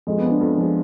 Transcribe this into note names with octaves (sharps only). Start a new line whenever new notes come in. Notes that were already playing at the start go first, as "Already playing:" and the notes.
F2 G#3
B3
F3 G#3 D4
F2
F3 G#3